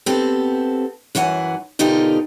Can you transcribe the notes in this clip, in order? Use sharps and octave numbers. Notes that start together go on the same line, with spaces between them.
B3 C4 G4 A4
F#2 E3 F#3 F#5 G#5
B2 D3 D#4 F4 G4 A#4